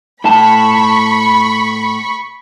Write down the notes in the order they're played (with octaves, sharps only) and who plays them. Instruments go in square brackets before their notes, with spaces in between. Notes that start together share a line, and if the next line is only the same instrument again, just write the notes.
[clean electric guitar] A2 A5 [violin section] B5 C#6